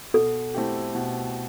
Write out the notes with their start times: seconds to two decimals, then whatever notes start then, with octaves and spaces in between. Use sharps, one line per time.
0.14 B2 A4
0.54 A3 C4 E4 G4
0.95 B2